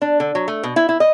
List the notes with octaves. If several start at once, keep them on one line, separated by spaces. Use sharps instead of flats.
D4
D3
F#3
A3
B2
E4
E4
D#5